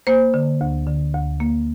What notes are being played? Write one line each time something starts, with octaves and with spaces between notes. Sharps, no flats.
A#3 C5
D3
D2
D3
D2
A#3